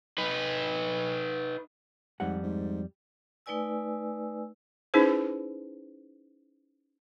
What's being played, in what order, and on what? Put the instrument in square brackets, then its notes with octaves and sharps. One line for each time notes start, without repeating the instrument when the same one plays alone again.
[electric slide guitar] D#4 B4
[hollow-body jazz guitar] F2 G3 F#5 [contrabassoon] G#2
[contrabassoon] G#2
[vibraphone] A3 D#4 B4 D5 G#5 E6
[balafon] C#4 D#4 E4 G#4 B4 C5